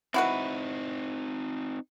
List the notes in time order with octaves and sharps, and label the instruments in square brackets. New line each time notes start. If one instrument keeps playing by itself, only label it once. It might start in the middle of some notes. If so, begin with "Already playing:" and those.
[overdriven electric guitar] C4 D#4 [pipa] E4 F#4 B4